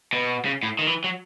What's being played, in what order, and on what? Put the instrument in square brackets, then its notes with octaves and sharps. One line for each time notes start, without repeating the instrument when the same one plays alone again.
[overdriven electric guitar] B2
C#3
A2
D#3
E3
F#3